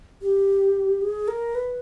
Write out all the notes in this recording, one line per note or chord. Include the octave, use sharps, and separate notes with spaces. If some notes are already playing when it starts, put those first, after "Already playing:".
G4
G#4
A#4
B4